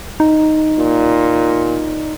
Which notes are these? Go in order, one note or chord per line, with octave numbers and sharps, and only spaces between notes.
D#4
A#2